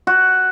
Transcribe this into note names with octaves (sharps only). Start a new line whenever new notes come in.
F#4